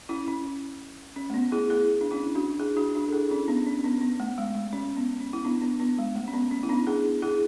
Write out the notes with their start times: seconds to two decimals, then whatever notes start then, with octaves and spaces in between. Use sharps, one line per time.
0.09 C#4 E4
0.28 C#4
1.16 C#4
1.30 A3
1.34 B3
1.52 E4 G#4
1.70 E4 G#4
2.01 D4
2.11 C#4 E4
2.35 D4 F#4
2.59 E4 G#4
2.76 D4 F#4
2.95 D4 F#4
3.08 A4
3.12 E4 G#4
3.30 C#4 E4
3.48 B3 D4
3.66 C#4
3.79 C#4
3.84 B3
4.01 B3
4.20 A3
4.38 G#3
4.55 G#3
4.73 C#4
4.97 B3
5.21 C#4
5.33 E4
5.45 B3 D4
5.62 B3
5.80 B3
5.99 G#3
6.15 A3
6.28 C#4
6.33 B3
6.51 C#4
6.63 E4
6.69 B3 D4
6.87 E4 G#4
7.22 E4 G#4